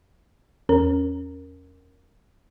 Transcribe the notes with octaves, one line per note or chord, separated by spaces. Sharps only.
E2 C#4 A#4